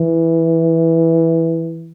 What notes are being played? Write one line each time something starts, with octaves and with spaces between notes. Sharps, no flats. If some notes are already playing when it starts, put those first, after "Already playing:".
Already playing: E3